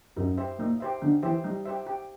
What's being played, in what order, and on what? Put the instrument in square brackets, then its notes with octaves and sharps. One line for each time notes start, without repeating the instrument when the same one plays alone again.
[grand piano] F#2 [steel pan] D#4
[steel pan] G4 C5 E5
[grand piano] A#2 [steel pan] D#4
[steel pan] G4 C5 E5
[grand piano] D3 [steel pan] D#4
[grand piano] E3 [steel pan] G4 C5 E5
[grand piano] G3 [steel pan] D#4
[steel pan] G4 C5 E5
G4